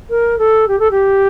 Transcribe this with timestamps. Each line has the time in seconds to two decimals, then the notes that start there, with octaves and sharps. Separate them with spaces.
0.09 A#4
0.38 A4
0.67 G4
0.78 A4
0.90 G4